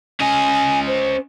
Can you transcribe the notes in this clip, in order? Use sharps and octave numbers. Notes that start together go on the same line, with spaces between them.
C#4 D#5 G#5
C5